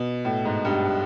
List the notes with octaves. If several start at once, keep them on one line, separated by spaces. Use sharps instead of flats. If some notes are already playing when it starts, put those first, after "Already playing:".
Already playing: B2
A2
G#2
G2